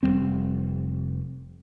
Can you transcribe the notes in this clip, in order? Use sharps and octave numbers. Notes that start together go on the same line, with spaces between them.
F1 G#2 G3 C4